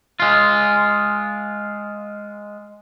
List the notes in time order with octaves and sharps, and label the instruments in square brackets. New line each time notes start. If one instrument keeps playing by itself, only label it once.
[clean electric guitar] G#3 F4